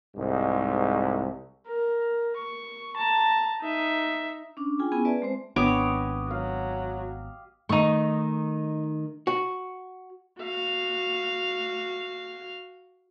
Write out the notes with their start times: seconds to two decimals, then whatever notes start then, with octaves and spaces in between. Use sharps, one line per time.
0.16 C2 G#2
1.67 A#4
2.36 C#6
2.96 A5 A#5
3.61 D#4 E5
4.57 C#4 D4 D6
4.79 F4 G#4 G5 G#5
4.92 B3 C#4 E4 G#4 G#5
5.05 B4 D5 E5 A5
5.22 G#3 C4 C5
5.56 G#1 B3 D4 G4 C#5 D#5 D6
6.31 F#3 F5
7.69 D#3 A3 D#4 C#6
9.27 F#4
10.39 F#4 F5